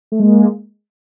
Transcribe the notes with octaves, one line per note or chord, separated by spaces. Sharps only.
A3
G#3 A#3